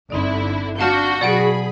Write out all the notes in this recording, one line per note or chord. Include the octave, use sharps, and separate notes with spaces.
G1 D3 C4 D#4 E4 D5
D4 F#4 F5 A5 F6 G6
B2 F#3 G#4 D5 F#5 B5 D7